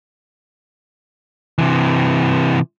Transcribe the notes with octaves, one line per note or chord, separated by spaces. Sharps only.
C3 E3